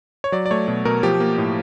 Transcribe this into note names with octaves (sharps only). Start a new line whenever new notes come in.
C#5
F#3 D5
D5
A3 C#5
B2
B2 A#4
F3 G4
A#3
A2